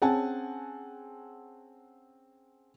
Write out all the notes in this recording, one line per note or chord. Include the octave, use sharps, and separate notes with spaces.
C4 C#4 G#4 F#5 G#5 A5